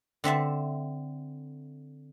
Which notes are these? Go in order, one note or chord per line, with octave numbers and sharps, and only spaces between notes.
D3 C4 E5 A5